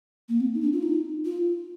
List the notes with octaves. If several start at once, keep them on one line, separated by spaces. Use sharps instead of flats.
A#3
C4
D#4
D4
F4
D#4
F4